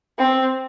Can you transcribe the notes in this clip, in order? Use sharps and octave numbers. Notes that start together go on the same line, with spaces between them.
C4